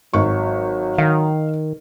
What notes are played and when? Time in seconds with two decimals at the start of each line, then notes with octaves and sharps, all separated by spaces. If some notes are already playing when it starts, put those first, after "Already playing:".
0.13 G#1 F#3 C#6
0.98 D#3 F5